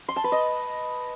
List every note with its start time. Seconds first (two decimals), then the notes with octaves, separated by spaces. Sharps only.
0.09 C6
0.16 A5
0.24 B4
0.32 D#5